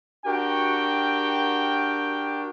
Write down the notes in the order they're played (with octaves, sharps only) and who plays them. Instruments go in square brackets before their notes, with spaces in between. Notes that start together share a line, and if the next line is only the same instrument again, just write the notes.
[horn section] D4 F#4 G4 A#4 G5